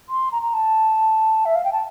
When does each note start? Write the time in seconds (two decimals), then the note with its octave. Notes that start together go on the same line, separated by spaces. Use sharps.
0.09 C6
0.32 A#5
0.43 A#5
0.54 A5
1.45 E5
1.55 F5
1.65 G5
1.73 A5